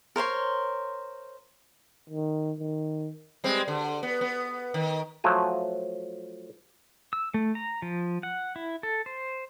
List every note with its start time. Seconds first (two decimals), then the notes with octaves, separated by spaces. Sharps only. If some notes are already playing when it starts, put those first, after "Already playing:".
0.16 A#4 C5 C#5 C6
2.09 D#3
2.60 D#3
3.44 G3 G#3 C4
3.68 D3
4.03 B3
4.21 B3
4.74 D#3
5.24 F3 F#3 A3 F#4 G#5
7.13 E6
7.34 A3
7.55 A#5
7.82 F3
8.23 F#5
8.56 E4
8.83 A4
9.06 C5